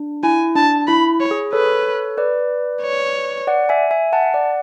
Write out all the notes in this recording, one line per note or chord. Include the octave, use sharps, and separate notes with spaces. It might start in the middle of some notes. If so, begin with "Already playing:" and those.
Already playing: D4
E4 G#5
D4 A5
E4 B5
C#5
G#4
A4 B4 C#5
B4 D5
C#5
D5 F#5
E5 G#5
E5 G#5
F#5 A5
D5 F#5